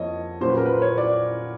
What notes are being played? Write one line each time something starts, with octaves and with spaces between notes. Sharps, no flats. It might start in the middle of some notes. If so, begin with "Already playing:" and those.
Already playing: F2 A#3 C#5 D#5
A#2 F#3 A#3 C#4 C5
B4
A#4
B4
C5
C#5
D5